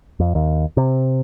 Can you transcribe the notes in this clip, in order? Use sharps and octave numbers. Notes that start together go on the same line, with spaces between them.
F2
D#2
C3